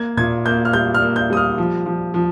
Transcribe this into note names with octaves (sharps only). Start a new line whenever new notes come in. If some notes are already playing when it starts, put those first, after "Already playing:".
Already playing: A#3 G#6
A#2 G#6
A#3 G6
F6
G3 G6
F6
A#3
G6
G3 D#6
F6
F3
F3
F3